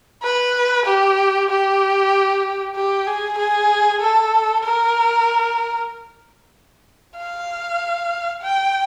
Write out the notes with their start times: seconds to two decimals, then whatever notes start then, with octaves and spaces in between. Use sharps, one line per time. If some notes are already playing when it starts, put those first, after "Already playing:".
0.23 B4
0.86 G4
1.50 G4
2.76 G4
3.07 G#4
3.38 G#4
4.01 A4
4.64 A#4
7.17 F5
8.42 G5